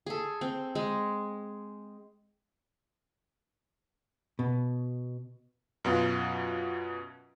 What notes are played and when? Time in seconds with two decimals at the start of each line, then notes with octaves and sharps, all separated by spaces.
0.06 G#4 A4
0.41 C4
0.75 G#3
4.39 B2
5.84 F#2 B2 B3 F4 F5